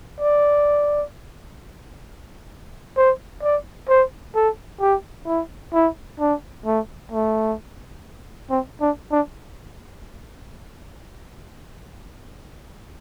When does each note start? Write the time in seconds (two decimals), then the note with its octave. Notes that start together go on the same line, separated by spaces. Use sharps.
0.20 D5
2.97 C5
3.43 D5
3.89 C5
4.35 A4
4.81 G4
5.27 E4
5.73 E4
6.20 D4
6.66 A3
7.12 A3
8.50 C4
8.81 D4
9.12 D4